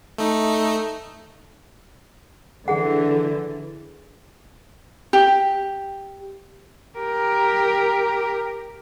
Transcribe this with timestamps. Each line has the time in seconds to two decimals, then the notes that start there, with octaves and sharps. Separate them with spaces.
0.18 A3 D#4
2.68 D3 E3 G#4 F#5
5.13 G4
6.98 G4 A#4